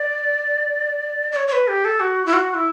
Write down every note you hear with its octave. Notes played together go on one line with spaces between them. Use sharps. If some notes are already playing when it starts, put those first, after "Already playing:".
Already playing: D5
D5
C#5
C#5
B4
G4
A4
F#4
E4
F#4
E4